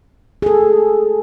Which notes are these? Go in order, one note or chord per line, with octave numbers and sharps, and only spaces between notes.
G#4 A4